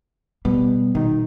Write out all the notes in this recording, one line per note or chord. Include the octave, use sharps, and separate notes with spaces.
B2 G3 B3
B2 D#3 D#4